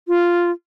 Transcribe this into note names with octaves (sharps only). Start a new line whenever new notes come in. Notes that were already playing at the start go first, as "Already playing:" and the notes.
F4